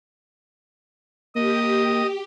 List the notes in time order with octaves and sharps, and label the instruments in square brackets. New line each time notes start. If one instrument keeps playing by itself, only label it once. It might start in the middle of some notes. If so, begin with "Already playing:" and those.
[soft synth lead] A#3 [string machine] G4 [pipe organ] D#5